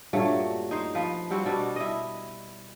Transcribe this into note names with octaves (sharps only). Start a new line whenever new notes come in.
G2 A#2 F#3 A3
D#4 C5
F3 B4
G3 C4 F#4
B2 G3 D4
E4 D#5